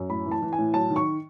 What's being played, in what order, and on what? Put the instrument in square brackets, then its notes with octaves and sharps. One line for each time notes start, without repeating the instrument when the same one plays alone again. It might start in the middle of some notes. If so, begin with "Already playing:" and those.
Already playing: [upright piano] F#2
A2 B5
E3
A5
E3
G#5
A2
F#3 A5
D#3
C#6